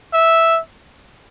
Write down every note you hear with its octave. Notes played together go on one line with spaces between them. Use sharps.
E5